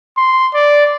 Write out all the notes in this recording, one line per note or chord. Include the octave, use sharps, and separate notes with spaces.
C6
D5